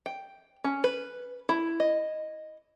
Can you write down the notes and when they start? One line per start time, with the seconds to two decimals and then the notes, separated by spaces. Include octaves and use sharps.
0.06 G5
0.64 C#4
0.84 B4
1.49 E4
1.80 D#5